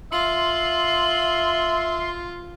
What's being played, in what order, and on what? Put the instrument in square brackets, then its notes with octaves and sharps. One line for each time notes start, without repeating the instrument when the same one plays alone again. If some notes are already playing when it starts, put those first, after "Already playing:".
[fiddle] F4 [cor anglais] E5 [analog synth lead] C6 [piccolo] F#7